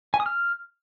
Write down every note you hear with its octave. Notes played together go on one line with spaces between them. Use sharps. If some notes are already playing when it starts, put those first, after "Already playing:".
G#5
D#6
F6